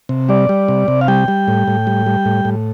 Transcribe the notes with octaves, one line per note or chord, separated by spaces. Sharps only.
C3
G3 D5
G3
C3
C3
F5
G3 G5
G3
A2
A2
G3
G3
A2
A2